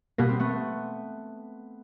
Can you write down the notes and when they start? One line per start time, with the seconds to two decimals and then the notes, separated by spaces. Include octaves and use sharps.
0.18 B2 G3 A#3 B3
0.29 C4
0.39 A3 B3